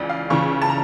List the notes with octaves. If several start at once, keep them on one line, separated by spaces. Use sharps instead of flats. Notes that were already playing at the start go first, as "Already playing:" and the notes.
Already playing: C#2 C#3 E3 D5
F5
C#2 C#3 E3 C#6
A5
A#5